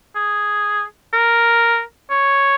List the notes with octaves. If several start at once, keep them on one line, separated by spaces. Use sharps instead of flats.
G#4
A#4
C#5